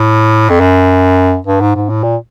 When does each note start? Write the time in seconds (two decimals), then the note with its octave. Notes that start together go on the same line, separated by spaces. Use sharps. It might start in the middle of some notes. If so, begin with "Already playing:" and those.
Already playing: A2
0.50 F2
0.61 F#2
1.47 G2
1.61 G#2
1.75 G#2
1.89 A2
2.03 A#2